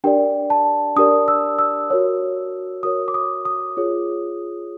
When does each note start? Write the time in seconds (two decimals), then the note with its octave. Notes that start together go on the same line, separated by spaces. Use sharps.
0.04 D4 G4 A#4 D5 G5
0.50 A5
0.96 D4 G4 A#4 D5 D#6
1.28 E6
1.59 E6
1.90 F#4 A#4 C#5
2.83 F#4 A#4 C#5 D#6
3.08 D6
3.14 D#6
3.45 D#6
3.77 F4 G#4 C#5